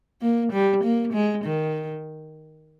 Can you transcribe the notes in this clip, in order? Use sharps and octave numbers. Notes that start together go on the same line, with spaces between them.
A#3
G3
A#3
G#3
D#3